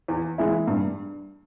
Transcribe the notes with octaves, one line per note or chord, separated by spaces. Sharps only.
E2
E3 G#3 E4
G2